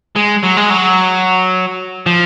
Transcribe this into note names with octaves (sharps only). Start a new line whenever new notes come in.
G#3
F#3
G#3
F#3
F3